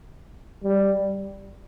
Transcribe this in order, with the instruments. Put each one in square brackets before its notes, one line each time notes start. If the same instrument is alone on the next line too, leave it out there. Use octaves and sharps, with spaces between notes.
[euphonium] G3